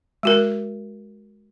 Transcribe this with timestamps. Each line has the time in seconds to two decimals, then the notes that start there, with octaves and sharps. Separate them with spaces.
0.23 G#3 F#4 A#4